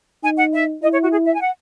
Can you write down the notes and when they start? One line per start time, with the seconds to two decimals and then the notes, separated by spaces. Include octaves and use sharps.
0.24 D#4 G#5
0.38 F#5
0.53 E5
0.82 E4 D#5
0.92 C#5
1.02 F#4
1.12 G#4
1.25 E5
1.34 G#5
1.41 F#5